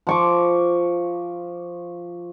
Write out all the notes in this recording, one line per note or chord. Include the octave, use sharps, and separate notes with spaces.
F3 C#6 D6